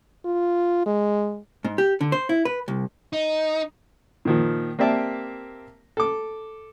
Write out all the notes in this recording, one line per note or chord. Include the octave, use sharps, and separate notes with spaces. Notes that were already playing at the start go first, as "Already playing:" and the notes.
F4
G#3
G#2
G4
D3
C5
E4
B4
C2
D#4
A#2 D#3 F3
A#3 C4 G4 D5 E5 A5
A4 D6